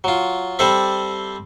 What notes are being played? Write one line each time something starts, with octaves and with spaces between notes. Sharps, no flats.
F#3 F4
G3 C4 A4 C5 D5 E5